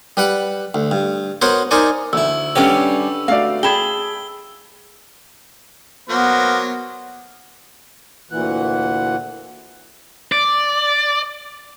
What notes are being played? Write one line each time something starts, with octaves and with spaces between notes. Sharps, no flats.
G3 B4 F#5
D2
G2
B3 F#4 A#4 C5 C#5 C6
D#4 A#4 C5 D5 G#5 C#6
D2 E4 E6
D3 G3 C#4 G4 B4 C#5
A3 F#4 D5 F5
G#4 G5 A5 B5 G#6 G7
F#3 A#3 B3 C5
D2 A#2 E3 F#5
D5